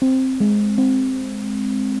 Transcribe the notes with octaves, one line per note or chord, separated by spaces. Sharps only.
C4
G#3
C4